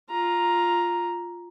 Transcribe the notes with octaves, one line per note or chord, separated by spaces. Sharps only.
F4 A#5